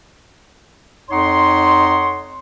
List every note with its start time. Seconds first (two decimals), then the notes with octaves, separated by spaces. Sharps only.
1.10 F2 D#4 C#5 F#5 C6